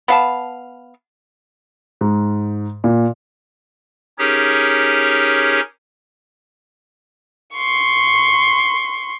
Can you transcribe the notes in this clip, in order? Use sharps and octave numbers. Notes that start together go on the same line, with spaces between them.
B3 F5 A5
G#2
A#2
C#4 D#4 G4 G#4 A#4 C#5
C6 C#6